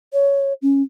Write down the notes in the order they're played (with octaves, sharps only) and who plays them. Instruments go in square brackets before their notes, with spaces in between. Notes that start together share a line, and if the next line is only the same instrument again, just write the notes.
[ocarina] C#5
C#4